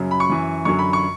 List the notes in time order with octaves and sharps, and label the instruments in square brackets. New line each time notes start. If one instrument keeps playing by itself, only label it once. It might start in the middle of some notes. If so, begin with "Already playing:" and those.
Already playing: [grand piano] F#2 C#3 F#3
B5
C#6
F#2 E3
F#2 D3 F#3 C#6
B5
C#6